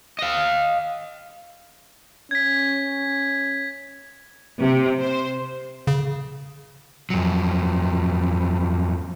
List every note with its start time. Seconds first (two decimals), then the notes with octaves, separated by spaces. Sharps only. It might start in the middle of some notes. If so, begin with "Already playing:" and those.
0.19 D#5 F5
2.31 C#4 G#6 B6
4.61 C3
5.01 C5
5.87 C#3
7.10 F2 F#3